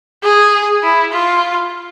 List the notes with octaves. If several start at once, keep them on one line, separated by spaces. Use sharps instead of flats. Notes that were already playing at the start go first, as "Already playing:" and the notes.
G#4
E4
F4